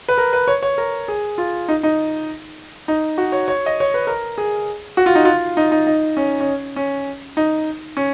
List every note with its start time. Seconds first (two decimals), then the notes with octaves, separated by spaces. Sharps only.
0.08 B4
0.18 A#4
0.33 B4
0.48 C#5
0.63 C#5
0.78 A#4
1.08 G#4
1.38 F4
1.68 D#4
1.83 D#4
2.88 D#4
3.18 F#4
3.32 C#5
3.48 C#5
3.66 D#5
3.80 C#5
3.94 B4
4.07 A#4
4.38 G#4
4.97 F#4
5.06 F4
5.15 D#4
5.25 F4
5.57 D#4
5.72 D#4
5.87 D#4
6.17 C#4
6.40 C#4
6.76 C#4
7.37 D#4
7.97 C#4